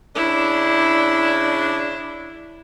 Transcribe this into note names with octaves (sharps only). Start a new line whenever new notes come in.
C#3 D4 E4